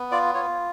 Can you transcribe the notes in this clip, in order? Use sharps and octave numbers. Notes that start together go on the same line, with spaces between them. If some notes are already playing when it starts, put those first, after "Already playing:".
Already playing: B3
F4 D5
F4 C#5